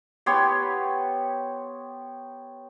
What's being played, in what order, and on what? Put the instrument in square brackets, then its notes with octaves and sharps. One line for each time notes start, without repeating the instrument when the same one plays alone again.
[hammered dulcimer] B3 G4 C#5 C6